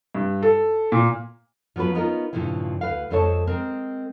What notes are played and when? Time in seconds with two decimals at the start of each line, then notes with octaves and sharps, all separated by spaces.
0.15 G2
0.42 A4
0.92 A#2
1.76 F3 F#3 B3 C#4 B4
1.95 B3 C#4 D#4 F4 A#4
2.33 G2 A#2 C#3 F3 E4
2.81 D2 B4 F5
3.10 F2 G#3 A4 C5 C#5 A5
3.47 G#3 C4 A#4